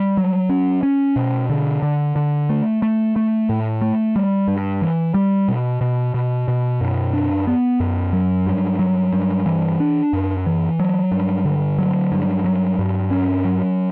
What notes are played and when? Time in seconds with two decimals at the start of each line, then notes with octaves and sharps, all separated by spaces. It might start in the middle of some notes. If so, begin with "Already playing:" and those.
Already playing: G3
0.17 F#3
0.49 C#4
0.83 C#4
1.16 B2
1.49 D3
1.82 D3
2.16 D3
2.49 A3
2.82 A3
3.16 A3
3.49 A2
3.81 A3
4.16 G3
4.48 G2
4.82 E3
5.14 G3
5.48 B2
5.81 B2
6.14 B2
6.48 B2
6.81 F#2
7.13 D4
7.47 B3
7.80 F#2
8.13 F#3
8.46 G2
8.79 F#3
9.12 G2
9.46 E3
9.80 D4
10.13 F#2
10.46 E3
10.80 F#3
11.12 G2
11.45 D3
11.78 F#3
12.12 G2
12.45 F#3
12.79 G2
13.11 C#4
13.45 F#3